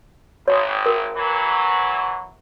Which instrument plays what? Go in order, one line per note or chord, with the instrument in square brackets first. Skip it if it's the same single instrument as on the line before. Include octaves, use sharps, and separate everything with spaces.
[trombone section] G#1 [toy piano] C#5
[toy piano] A#4
[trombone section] E3 F#3